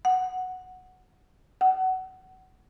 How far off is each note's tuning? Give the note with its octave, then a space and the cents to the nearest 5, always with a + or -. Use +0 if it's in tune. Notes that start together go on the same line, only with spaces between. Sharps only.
F#5 -5
F#5 +20